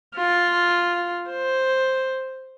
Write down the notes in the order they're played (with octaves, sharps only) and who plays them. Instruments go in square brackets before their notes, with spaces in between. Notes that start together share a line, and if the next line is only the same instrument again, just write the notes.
[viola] F4
C5